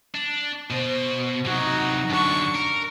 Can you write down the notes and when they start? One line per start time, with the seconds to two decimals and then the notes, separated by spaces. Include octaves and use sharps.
0.14 D4
0.70 B2 C5
1.45 C3 F#3 D#4 F#4
2.10 F#2 D3 D4 C#6
2.55 A#4